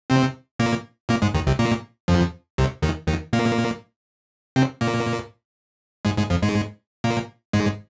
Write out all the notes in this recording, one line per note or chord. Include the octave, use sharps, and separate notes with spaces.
C3 C4
A#2 A#3
A#2 A#3
G#2 G#3
D#2 D#3
C2 C3
A#2 A#3
F2 F3
C2 C3
D#2 D#3
D#2 D#3
A#2 A#3
C3 C4
A#2 A#3
G#2 G#3
G#2 G#3
F2 F3
G#2 G#3
A#2 A#3
G#2 G#3